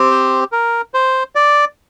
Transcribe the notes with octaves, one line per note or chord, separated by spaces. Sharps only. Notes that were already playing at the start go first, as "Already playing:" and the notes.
Already playing: C4 G4
C5
A#4
C5
D5